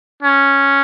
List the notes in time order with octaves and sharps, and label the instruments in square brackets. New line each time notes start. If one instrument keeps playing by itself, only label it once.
[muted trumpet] C#4